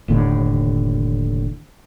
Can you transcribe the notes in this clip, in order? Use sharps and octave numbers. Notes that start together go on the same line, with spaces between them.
F1 D#2 A2 D3